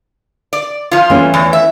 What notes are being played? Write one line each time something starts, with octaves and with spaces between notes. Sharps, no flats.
D5
F3 F4
E3 A3 C#4
E2
E5